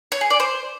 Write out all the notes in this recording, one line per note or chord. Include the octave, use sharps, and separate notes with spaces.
C#5
G#4
D5
C5